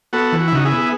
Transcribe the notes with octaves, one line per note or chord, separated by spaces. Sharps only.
B3 F#4 A4
E3
F#4
E4
C#3 D#4 F#4
E4 G#4
B3
G#4